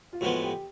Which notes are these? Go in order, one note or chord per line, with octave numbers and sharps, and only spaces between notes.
F4
A2 F3 G#3 B3 F#4
G4